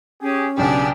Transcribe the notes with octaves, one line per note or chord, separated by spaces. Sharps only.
C#4 G4 G#4
B1 C#3 B3 D4 G4 G#4